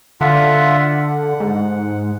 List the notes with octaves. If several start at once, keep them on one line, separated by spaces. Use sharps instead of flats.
D3 F4 E5 F#5
F#5
G#2